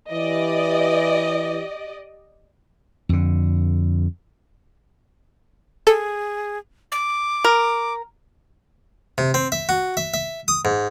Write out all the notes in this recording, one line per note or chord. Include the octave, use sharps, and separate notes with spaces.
E3 G4 D5 D#5
F2 D3
G#4 A4
D6
A#4
C3
C4
E5
F#4
E5
E5
D#6
G#2